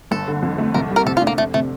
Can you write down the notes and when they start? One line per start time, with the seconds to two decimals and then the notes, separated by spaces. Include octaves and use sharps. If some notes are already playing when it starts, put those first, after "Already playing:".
0.11 G1 A4
0.28 D3
0.42 F2
0.58 A3
0.74 C2 A#4
0.91 G3
0.96 A#4
1.06 C3 A4
1.17 F4
1.22 D4
1.27 A#3
1.38 F1 A3
1.54 C3 A3